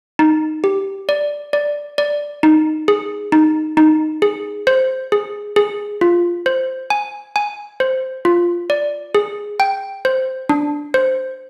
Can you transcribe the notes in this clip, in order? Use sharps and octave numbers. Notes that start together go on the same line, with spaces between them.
D#4
G4
D5
D5
D5
D#4
G#4
D#4
D#4
G#4
C5
G#4
G#4
F4
C5
G#5
G#5
C5
F4
D5
G#4
G5
C5
D4
C5